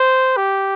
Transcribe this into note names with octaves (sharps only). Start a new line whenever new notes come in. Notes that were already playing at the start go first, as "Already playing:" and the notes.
Already playing: C5
G4